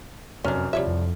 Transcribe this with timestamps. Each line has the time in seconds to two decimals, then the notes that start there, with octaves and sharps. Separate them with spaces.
0.44 F1 F#2 C#4 D4 F6
0.73 C2 F3 G3 C#5 E5
0.87 F2